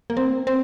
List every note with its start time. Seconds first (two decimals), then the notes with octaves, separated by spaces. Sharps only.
0.10 A#3
0.17 C4
0.47 C4